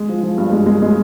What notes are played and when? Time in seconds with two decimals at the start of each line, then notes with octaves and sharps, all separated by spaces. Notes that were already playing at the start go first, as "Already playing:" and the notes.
Already playing: G#3
0.09 F3
0.23 F3
0.38 G2
0.52 G#3
0.66 G#3
0.82 G#3